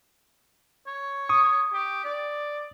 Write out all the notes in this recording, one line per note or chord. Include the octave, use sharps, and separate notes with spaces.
C#5
C#6 D#6
G4
D5